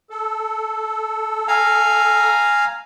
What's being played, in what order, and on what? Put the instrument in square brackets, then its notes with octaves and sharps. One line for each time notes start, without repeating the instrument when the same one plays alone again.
[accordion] A4
[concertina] F5 G#5 A#5